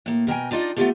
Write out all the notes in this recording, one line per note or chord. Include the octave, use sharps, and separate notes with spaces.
A2 A#3
B2 A#4 G5 G#5
D4 D#4 F4 D5 D#5
A3 B3 C4 F4 G4 A4